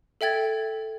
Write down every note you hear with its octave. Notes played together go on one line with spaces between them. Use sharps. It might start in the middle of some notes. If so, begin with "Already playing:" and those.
A4 E5 G5 G#6 A6